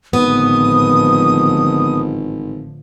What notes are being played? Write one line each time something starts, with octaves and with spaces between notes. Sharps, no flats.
G#1 A2 D3 F3 B3 D#6